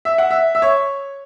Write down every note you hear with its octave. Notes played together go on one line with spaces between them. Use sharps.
E5
F#5
E5
E5
C#5